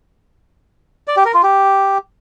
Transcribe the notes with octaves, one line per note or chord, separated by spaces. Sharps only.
D5
G4
A#4
F4
G4